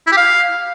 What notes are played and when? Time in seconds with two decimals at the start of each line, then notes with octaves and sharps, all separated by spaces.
0.07 E4
0.12 G4
0.17 F5